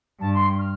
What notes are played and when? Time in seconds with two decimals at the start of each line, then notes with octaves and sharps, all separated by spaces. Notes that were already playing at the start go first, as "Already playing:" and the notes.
0.20 G2 A5
0.33 C6
0.58 F6